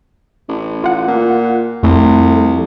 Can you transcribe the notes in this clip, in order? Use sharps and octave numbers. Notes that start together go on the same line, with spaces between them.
A1
F4 F#5
A#2
C2 F2 A3